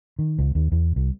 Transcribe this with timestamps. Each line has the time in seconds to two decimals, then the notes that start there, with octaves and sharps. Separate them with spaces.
0.19 D#3
0.39 C#2
0.55 D#2
0.72 E2
0.96 C2